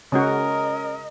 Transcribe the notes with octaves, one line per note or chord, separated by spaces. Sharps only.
C#3 G#3 C#4 F#4 A#4 D#5